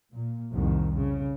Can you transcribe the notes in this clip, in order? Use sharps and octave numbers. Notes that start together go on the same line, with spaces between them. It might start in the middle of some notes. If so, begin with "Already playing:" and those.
A#2
C2 F2 A2 D#3
C#3